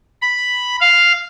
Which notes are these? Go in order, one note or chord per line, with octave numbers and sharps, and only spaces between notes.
B5
F5